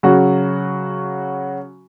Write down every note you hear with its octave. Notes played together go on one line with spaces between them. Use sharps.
C#3 F#3 F#4